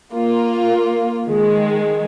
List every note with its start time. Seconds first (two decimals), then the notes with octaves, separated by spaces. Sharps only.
0.13 A#3 F4
1.25 D#3 G#3